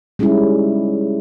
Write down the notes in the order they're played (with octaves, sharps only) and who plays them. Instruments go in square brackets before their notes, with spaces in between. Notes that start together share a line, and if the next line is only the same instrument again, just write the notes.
[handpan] G3 G#3 C#4 D#4 E4